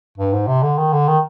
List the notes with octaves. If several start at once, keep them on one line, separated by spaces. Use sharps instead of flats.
G2
G#2
C3
D3
D#3
D3
D#3